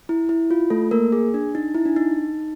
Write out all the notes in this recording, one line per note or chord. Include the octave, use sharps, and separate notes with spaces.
E4
E4
F4
A3 A4
A#3 A#4
G#4
D4
D#4
E4
D4
D#4